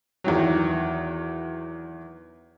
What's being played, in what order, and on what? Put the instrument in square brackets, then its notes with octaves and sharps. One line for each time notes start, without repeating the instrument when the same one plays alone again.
[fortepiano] E2 D#3 F#3